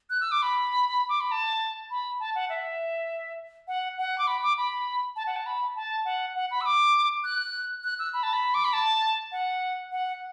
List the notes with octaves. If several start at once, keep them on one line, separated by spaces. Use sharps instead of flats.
F#6
E6
D6
B5
D6
B5
A5
B5
A5
F#5
E5
F#5
F#5
D6
B5
D6
B5
A5
F#5
A5
B5
A5
F#5
F#5
B5
E6
D6
F#6
F#6
E6
B5
A5
B5
D6
B5
A5
F#5
F#5